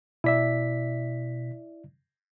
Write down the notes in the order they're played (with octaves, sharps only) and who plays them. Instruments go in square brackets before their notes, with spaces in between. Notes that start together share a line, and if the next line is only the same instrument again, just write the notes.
[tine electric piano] B2 B6 [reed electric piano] E4 D5 E5